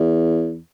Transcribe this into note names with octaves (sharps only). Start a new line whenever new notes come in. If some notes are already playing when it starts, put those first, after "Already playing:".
Already playing: E2